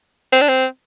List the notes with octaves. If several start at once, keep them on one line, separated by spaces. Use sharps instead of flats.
C4
D4
C4